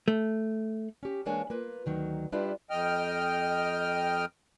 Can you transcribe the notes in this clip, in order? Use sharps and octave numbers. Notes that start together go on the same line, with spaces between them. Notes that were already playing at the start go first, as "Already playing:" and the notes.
A3
C#4 G4
E3 G#3 A#3 D4 C#5 G#5
A#3 F4 B4
D2 D#3 F#3
G3 D4 E4 F4 G4 B4
F2 D#5 G5 F6